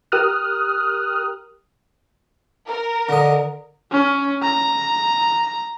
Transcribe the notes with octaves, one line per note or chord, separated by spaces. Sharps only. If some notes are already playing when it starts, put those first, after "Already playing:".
G4 A#4 D#6 F6 F#6
A#4
D3 D#5
C#4
A#5